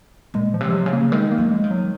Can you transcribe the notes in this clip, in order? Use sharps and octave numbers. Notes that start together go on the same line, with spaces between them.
A#2 G#3
F3
C3
F#3
C#3
A#3
D#3 G#3
A#3
F3
G#3
D#3
F#3